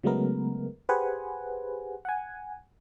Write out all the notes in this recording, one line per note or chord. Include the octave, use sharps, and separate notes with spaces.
C#3 F#3 G#3 A3 B3 A#4
G4 G#4 B4 C5 F#5 G#5
F#5 G#5